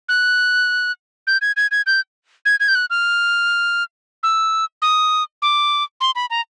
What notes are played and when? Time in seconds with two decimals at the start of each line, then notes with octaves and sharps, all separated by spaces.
0.09 F#6
1.27 G6
1.42 G#6
1.57 G#6
1.71 G#6
1.86 G6
2.46 G#6
2.60 G#6
2.68 G6
2.75 F#6
2.90 F6
4.23 E6
4.82 D#6
5.42 D6
6.01 C6
6.15 B5
6.30 A#5